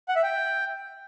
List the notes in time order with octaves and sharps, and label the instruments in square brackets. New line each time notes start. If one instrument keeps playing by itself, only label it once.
[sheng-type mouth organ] F#5
E5
G5